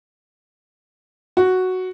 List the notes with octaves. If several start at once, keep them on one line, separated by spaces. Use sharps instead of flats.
F#4